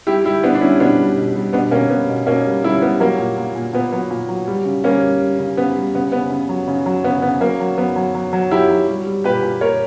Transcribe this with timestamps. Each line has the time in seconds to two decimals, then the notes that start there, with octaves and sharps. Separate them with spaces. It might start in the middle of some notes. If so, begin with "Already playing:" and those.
0.07 G3 E4 G4
0.24 G3 E4 G4
0.43 G3 B3 D4
0.55 D4
0.61 G3 C#4 E4
0.80 B2 B3 D4
0.98 G3
1.17 B2
1.36 G3
1.53 B2 B3 D4
1.71 B2 A#3 C#4
1.90 G3 B3
2.09 B2
2.26 B2 A#3 C#4
2.46 G3
2.64 G3 C#4 E4
2.82 G3 B3
3.00 F#3 A#3
3.18 A#2
3.38 A#2
3.56 A#2
3.73 A#2 B3
3.92 F#3 B3
4.11 A#2
4.29 F#3
4.48 G3
4.65 C#3
4.84 G3 A#3 C#4
5.03 G3
5.21 G3
5.39 C#3
5.57 C#3 B3
5.76 G3
5.95 C#3 B3
6.12 C#3 B3
6.31 C#3
6.49 F#3
6.68 C#3
6.86 F#3
7.04 C#3 B3
7.22 C#3 B3
7.41 F#3 A#3
7.60 F#3
7.78 F#3 B3
7.96 F#3
8.15 F#3
8.33 F#3
8.51 F#3 E4 G4
8.70 F#3
8.89 G3
9.06 G3
9.24 A#2 G4 B4
9.43 A#2
9.61 A#2 A#4 C#5